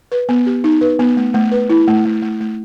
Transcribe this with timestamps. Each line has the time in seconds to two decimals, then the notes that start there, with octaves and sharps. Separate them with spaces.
0.12 B4
0.29 B3
0.46 G4
0.64 D#4
0.81 B4
0.99 B3
1.17 A3
1.34 A3
1.52 B4
1.70 E4
1.88 A3
2.05 A3
2.22 A3
2.40 A3